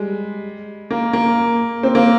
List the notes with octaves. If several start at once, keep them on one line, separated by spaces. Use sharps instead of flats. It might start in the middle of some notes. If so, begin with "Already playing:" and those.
Already playing: G3 G#3
A#3
A#3
C4
A#3